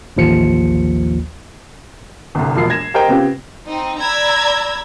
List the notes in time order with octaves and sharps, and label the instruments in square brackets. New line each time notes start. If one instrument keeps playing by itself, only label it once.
[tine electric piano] A1 D#2 F3 C#7
[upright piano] G1 C2
E1 A#1 A#2 F3 C7
G#6 A#6 E7
G4 A#4 C5 D#5 G5
C#3 B3 C4 F4 G4
[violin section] C4 D#4
D5 A#5 B5 E6 G#6